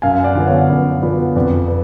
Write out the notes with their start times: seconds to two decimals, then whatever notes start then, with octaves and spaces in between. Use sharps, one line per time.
0.02 F#2 F5 G#5
0.24 D5 F#5
0.35 D3 F3 B3
0.48 C#5 F5
0.69 F#2 B4 D5
1.02 D3 F3 B3 B4 D5
1.36 F2 B4 D5
1.68 B4